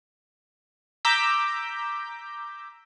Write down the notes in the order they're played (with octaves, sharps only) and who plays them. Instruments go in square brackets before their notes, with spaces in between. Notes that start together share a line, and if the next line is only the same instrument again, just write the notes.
[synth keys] A#5 D6 E6 G6 B6